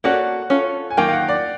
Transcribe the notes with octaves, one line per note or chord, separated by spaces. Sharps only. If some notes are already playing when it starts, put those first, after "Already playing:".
A#3 C#4 F#4 A4 D5 F#5
C#4 F4 A4
G#5
D#3 F#3 A#3 G5
F5
F#5
D5